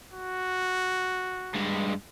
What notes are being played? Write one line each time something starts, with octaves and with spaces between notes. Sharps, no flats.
F#4
G2 G#3